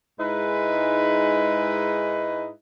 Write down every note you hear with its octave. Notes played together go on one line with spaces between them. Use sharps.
G#2 G#3 D#4 E4 B4